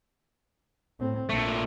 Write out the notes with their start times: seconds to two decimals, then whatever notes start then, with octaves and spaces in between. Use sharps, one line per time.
0.99 A2 C4
1.29 A#1 A#2 A3